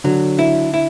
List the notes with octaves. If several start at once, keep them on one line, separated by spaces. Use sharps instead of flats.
D3 F#3
E4
E4